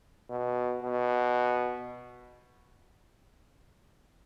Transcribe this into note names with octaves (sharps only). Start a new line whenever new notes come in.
B2
B2